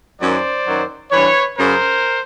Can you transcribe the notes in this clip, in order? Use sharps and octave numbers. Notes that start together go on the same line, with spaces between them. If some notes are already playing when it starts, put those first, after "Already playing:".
F#2 D#3 F#3 C5 D5
F#2 D#3 F#3
G2 E3 B4 C#5
F#2 C#3 F#3 A#4 C5